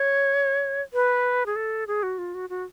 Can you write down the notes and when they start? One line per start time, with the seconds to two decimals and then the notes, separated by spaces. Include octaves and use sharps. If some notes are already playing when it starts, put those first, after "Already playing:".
Already playing: C#5
0.93 B4
1.46 G#4
1.56 A4
1.87 G#4
2.03 F#4
2.18 F4
2.35 F#4
2.50 F#4